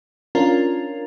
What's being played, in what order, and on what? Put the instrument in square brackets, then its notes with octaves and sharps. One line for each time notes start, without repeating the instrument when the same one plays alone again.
[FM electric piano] C#4 D4 F4 A#4